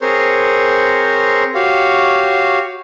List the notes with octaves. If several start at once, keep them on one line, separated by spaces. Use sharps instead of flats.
C4 G#4 A#4 C5 C#5
F#4 G4 C#5 F5